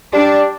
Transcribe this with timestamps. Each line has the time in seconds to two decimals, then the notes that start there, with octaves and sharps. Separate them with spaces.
0.13 G3 D4